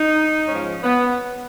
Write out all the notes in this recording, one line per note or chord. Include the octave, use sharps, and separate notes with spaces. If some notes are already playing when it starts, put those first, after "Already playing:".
Already playing: D#4
G#2 F3 C#4
B3